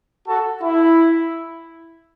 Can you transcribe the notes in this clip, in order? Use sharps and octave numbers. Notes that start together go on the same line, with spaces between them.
F#4 A4
E4